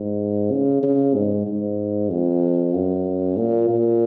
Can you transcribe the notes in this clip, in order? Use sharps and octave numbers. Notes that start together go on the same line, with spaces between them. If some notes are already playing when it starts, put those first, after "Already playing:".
Already playing: G#2
C#3
C#3
G#2
G#2
F2
F#2
A#2
A#2